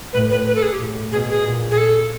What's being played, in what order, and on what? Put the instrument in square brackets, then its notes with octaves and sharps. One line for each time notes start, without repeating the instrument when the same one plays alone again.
[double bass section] A2 [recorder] B4
[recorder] B4
B4
A4
G#4
G4
[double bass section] A2
[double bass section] B2 [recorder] G#4
[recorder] G#4
[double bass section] A#2
[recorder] G#4
A4